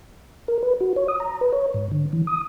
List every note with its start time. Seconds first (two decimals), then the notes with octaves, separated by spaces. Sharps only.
0.48 A#4
0.63 B4
0.81 F#4
0.96 C#5
1.08 D#6
1.20 A#5
1.41 B4
1.53 C#5
1.74 G#2
1.92 D3
2.13 E3
2.27 D#6